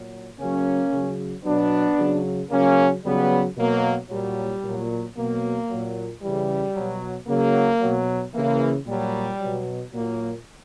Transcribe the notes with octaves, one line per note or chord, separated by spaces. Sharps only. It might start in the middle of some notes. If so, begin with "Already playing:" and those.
Already playing: A#2 F#3
C#3 F#3 A#3 C#4
C#3 F#3
B2 F#3 B3 D4
C#3 F#3
C#3 F#3 A#3 C#4
C#3 F#3 G3 B3
B2 F#3 A#3
A#2 F#3 G3
A#2 F#3
B2 F#3 A#3
A#2 F#3
C#3 E3 G3
B2 F#3
C#3 F#3 A#3
B2 F#3
C#3 E3 A#3
A#2 F#3 G3
B2 F#3
A#2 F#3 A#3